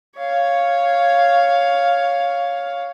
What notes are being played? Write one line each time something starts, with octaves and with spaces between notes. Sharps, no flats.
C#5 F5